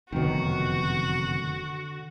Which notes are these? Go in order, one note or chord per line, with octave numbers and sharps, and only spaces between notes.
F1 F#2 B2 D3 D#3 F#4